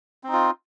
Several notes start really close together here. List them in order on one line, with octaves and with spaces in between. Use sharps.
C4 D#4 F4